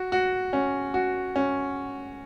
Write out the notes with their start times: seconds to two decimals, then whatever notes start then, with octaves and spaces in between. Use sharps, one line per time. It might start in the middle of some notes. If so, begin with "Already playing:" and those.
Already playing: F#4
0.12 F#4
0.53 C#4
0.94 F#4
1.36 C#4